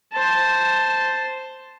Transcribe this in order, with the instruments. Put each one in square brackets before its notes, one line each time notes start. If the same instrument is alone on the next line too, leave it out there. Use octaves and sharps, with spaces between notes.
[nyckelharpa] C5 A5